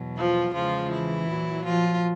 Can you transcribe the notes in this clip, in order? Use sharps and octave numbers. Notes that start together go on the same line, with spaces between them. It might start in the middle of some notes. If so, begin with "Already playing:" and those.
Already playing: E2 B2 F#3
F3 F4
E2 C#3 E3 F3 G#3 F4
E3 E4
A#2 F#3
F3 F4